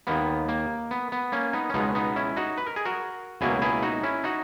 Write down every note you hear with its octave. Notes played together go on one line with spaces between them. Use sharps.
D#2 D#3 A#3 B3
A#3
B3
B3
A#3 C#4
B3 D#4
C#4
C#2 B2 G#3 B3 D#4
B3 D#4
C#4 E4
D#4 F#4
B4
A#4
G#4
F#4 A#4
C#2 B2 F#3 A#3 E4 G#4
E4 G#4
D#4 F#4
C#4 E4
D#4 F#4